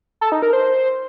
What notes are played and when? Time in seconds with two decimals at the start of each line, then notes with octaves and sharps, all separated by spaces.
0.21 A4
0.32 D#4
0.42 A#4
0.53 C5